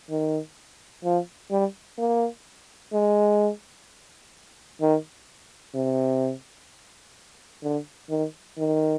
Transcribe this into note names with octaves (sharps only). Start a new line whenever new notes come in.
D#3
F3
G3
A#3
G#3
D#3
C3
D3
D#3
D#3